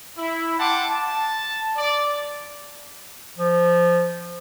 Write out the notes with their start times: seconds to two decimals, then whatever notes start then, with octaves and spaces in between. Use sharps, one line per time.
0.17 E4
0.59 F#5 G5 A5 C6 D6
0.92 A5
1.77 D5
3.38 F3